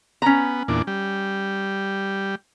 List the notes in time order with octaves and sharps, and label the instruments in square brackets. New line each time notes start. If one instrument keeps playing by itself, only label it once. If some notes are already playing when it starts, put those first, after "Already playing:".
[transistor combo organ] B3 [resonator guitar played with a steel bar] C#4 A#5
[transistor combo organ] E2 A#2 D4
G3